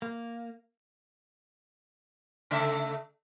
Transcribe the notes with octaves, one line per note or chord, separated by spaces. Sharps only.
A#3
C#3 A3 E5